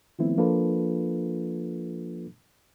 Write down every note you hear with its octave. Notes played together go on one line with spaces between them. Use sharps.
D#3 F3 A3 B3 C4 E4
F3 A#3 D4 F4 A4 B4